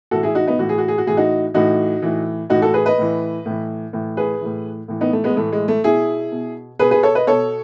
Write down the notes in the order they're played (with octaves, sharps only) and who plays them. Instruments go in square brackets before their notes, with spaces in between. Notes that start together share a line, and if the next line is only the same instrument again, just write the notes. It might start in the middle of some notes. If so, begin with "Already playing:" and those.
[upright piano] A2 E3 F#4 A4
E4 G#4
D#4 F#4
B3 D#4
A2 E3 F#4
G#4
F#4
G#4
F#4
A2 E3 G#4
D#4 F#4
A2 E3 D#4 F#4
A2 E3
A2 D#4 F#4
E3
F#4 A4
G#4 B4
B4 D#5
A2 E3
A2 E3
A2 E3
G#4 B4
A2 E3
A2 E3
B3 D#4
A3
G#3 B3
A2 E3 A3
G#3
A3
B2 E4 G#4
B2
B2 G#4 B4
G#4 B4
A4 C#5
B4 D#5
B2 A4 C#5